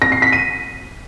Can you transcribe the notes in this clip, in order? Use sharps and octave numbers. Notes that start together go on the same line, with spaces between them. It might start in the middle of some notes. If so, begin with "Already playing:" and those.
A#6
C7
B6
D#7